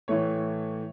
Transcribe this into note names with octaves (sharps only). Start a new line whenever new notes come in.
A2 E3 A3 C#5